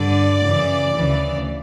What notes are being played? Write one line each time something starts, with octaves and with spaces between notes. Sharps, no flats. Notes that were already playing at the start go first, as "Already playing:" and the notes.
Already playing: G2 D3 D5
F#2 C#3 E3
D2 C#3 E3